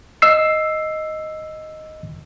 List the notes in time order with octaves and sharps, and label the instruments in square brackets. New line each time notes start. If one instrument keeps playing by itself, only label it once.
[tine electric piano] D#5 E6 C7